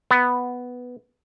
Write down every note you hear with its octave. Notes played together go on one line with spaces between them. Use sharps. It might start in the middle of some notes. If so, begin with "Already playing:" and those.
B3